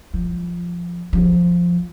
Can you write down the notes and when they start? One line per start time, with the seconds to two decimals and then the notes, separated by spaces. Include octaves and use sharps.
0.14 F3
1.13 F3